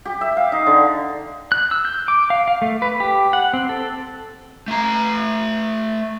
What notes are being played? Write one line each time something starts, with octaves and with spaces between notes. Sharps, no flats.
G4
E5
F5
D#4
D3
F#6
E6
G6
D6
F5
F5
A3
B4
G4
F#5
C4
A4
A3 A#5